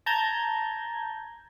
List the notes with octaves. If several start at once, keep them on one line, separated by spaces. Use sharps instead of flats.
A5 A#5 G6 G#6